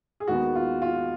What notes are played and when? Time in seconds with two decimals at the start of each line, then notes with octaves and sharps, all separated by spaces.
0.20 G#4
0.28 D#2 D#3 G#3 B3 F#4
0.55 F4
0.82 F4